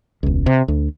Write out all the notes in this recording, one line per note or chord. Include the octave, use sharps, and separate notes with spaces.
E1 C#2
C3
D2